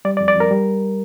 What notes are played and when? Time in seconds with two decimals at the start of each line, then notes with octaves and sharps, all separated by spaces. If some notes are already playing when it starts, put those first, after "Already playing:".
0.05 G3 D5
0.17 D5
0.20 F2
0.28 D5
0.35 F2 A#4
0.51 G3